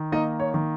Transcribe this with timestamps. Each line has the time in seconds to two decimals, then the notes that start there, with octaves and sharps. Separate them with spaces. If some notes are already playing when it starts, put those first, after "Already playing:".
Already playing: D#3
0.12 A#3 D#4 D#5
0.40 C#5
0.54 D#3